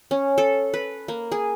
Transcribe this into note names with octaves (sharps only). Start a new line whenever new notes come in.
C#4
A4
B4
A#3
G#4